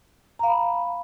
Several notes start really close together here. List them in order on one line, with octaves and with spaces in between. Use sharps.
A#5 F5 B5